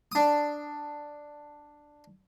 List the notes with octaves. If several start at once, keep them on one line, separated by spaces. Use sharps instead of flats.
D4 D#6